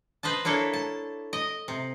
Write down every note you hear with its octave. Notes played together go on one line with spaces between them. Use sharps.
B4 C5 D#5 A5
A#3 D4 E4 A4 C#5
A5
D#5
C3